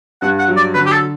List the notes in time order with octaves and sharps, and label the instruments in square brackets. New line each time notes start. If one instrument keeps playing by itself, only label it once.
[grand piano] G2 [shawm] F#5
[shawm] F#5
[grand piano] F#3
[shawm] D5
[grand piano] D3 [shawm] B4
[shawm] G4
A4